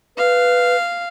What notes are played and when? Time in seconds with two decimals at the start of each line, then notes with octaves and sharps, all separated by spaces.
0.17 B4 F5